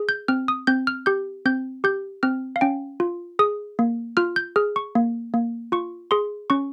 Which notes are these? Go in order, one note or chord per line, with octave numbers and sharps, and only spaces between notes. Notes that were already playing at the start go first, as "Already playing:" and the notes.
Already playing: G#4
G6
C4 F6
D#6
C4 G6
F6
G4 G6
C4 G6
G4 G6
C4 F6
F5
C#4 G5
F4
G#4 D#6
A#3
F4 F6
G6
G#4 F6
C#6
A#3
A#3
F4 C#6
G#4 C6
C#4 C#6